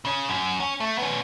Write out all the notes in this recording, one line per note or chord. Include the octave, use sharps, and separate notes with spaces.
C#3 C#4
F#2
C#4
A3
B3 C#4